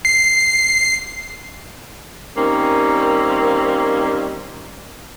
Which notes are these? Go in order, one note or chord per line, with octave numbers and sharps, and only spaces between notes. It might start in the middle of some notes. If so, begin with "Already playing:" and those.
C7
D#3 G3 A#3 C4 C#4